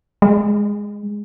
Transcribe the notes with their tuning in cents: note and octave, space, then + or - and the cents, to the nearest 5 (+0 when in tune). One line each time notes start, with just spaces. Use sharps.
G#3 -10